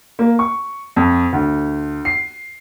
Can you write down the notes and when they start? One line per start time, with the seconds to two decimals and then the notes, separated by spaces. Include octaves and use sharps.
0.19 A#3
0.39 C#6
0.96 F2
1.33 D2
2.05 C7